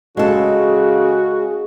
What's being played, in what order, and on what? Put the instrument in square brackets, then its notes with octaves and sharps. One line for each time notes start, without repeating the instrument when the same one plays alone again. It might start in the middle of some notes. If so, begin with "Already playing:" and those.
[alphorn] C#3 [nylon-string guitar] G#3 A4 [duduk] F#4 [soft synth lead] G#4